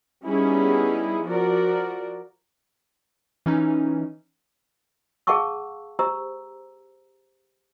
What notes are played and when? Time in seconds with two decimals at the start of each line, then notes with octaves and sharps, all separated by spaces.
0.24 G3 B3 C#4 D#4 E4 G#4
1.24 F3 F#4 A#4 D5
3.46 E3 C#4 D#4
5.27 G#4 F5 F#5 A5 C#6 E6
5.99 G4 C5 A#5 E6